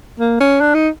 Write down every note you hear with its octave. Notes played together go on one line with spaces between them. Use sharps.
A#3
C#4
D4
D#4